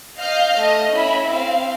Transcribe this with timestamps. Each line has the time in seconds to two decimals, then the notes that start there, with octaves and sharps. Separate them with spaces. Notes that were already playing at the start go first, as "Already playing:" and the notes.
0.19 D#5 F5 F6 G6
0.58 A3 D#5
0.92 C#4 E4 B5
1.30 C4 F5